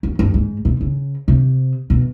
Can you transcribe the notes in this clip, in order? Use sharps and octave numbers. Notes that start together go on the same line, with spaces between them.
F#2
G2
G#2
B2
C#3
C3
B2